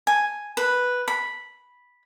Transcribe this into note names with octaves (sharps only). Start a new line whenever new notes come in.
G#5
B4
B5